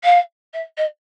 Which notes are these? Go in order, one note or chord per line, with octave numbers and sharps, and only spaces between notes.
F5
E5
D#5